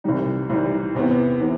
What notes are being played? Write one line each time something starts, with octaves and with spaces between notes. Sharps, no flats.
C2 C3 E3 G3 D#4
C2 C3 E3 G3 D#4
E2 C3 E3 B3
C3 E3 B3